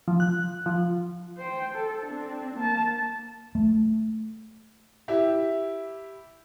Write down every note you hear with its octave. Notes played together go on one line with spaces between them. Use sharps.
F3
F#6
F3
C5 G5
A4
C4 D4
A#3 A5
A3
E4 G4 E5